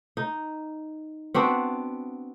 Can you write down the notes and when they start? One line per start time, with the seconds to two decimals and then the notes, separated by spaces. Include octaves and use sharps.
0.17 D#4
1.34 B3 C4 D4 F#4